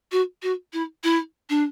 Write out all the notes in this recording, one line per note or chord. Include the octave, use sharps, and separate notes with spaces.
F#4
F#4
E4
E4
D4